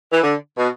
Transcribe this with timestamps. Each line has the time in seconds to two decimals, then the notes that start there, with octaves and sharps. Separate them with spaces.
0.12 E3
0.23 D3
0.58 B2